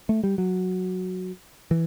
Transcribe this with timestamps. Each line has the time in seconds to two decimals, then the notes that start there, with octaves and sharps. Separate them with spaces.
0.09 A3
0.24 G3
0.38 F#3
1.71 E3